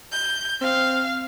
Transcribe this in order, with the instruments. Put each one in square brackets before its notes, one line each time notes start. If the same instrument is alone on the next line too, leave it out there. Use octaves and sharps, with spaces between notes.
[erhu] G6
[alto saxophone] C4 [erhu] F5